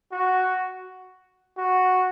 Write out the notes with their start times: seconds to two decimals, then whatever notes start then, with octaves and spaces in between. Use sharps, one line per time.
0.12 F#4
1.58 F#4